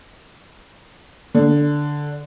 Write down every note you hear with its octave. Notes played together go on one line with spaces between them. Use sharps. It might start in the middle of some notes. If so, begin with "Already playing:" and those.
D3